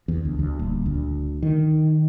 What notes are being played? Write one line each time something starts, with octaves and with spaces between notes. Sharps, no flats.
E2
D2
D2
D#1
D2
D#3